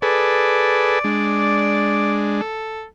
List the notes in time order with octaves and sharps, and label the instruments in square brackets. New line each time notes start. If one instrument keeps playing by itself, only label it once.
[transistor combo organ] G#4 A4 B4 [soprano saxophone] D5
[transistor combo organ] G#3 D4
[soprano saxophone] A4